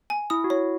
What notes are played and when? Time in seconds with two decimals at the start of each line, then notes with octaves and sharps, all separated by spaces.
0.10 G#5
0.30 E4 D#6
0.44 F#4
0.50 E4 C#5